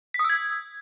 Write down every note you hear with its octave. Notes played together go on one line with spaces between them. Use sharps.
B6
D#6
E6
G#6